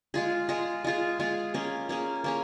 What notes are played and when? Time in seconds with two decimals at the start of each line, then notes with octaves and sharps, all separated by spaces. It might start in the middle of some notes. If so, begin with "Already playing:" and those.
0.14 G#3 F4 G#4
0.49 G#3 F4 G#4
0.85 G#3 F4 G#4
1.20 G#3 F4 G#4
1.54 A#3 C#4 G#4
1.89 A#3 C#4 G#4
2.24 A#3 C#4 G#4